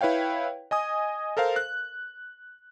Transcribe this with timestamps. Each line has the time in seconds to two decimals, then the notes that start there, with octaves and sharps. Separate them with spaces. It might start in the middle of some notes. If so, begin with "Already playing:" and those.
0.01 E4 B4 C#5 F5 G5
0.71 D#5 G#5 D#6
1.37 A4 A#4 C5 F5
1.56 F#6